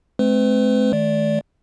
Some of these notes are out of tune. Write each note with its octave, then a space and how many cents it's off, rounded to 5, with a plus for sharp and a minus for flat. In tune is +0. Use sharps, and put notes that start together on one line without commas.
A3 -40 C4 +0 B4 +45
D#3 +10 A3 -35 D5 -15